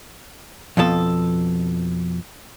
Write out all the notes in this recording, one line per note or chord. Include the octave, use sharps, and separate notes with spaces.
F2 B2 F3 A4